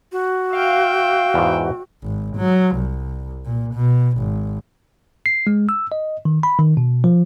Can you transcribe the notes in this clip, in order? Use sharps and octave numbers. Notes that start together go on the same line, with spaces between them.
F#4
E5 F5 G5
E2 G#2
G#1
F#3
C2
A#2
B2
G#1
C7
G#3
E6
D#5
D#3
B5
D#3
B2
F3